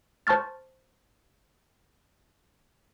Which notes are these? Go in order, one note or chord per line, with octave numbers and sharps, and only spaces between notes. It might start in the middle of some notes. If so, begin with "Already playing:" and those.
C5 A5 C#6 F6 A6